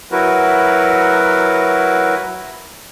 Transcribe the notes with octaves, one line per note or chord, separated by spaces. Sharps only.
F#3 E4 F#4 A#4 B4